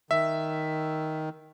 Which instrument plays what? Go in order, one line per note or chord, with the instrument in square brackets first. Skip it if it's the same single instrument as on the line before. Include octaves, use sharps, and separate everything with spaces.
[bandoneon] D#3 [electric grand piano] E5